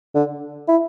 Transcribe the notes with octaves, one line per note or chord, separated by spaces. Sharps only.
D3
E4